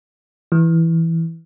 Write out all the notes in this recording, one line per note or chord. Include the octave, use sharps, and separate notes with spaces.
E3